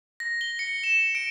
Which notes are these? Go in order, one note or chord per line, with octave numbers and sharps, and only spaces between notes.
A#6
G7
C#7
E7
D7